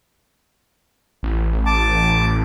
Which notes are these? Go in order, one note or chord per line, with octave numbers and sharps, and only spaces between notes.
A1
A5 D6